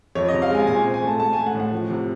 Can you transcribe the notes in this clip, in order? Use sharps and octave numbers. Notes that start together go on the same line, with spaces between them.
F2 C#5
C3 D#5
F5
G#3 G#5
A#2 G#5
C4
G#5
A3 A5
A3 A5
A3 G#5
F#5
A2
F#5
F3
C3